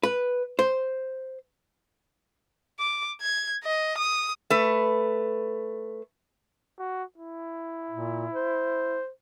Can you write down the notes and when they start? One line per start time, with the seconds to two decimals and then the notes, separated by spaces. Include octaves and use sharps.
0.03 B4
0.59 C5
2.79 D6
3.21 G#6
3.64 D#5
3.98 D#6
4.50 A3 B4
6.79 F#4
7.18 E4
7.90 A#2
8.32 C5